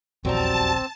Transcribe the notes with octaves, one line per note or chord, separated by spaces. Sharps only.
D#1 A#1 E2 F#3 G3 C4 A5 A#5